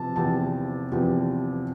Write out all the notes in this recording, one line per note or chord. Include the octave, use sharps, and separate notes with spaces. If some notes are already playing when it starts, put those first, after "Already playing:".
Already playing: C3 F3 A5
E2 C3 F3 A5
E2 C3 F3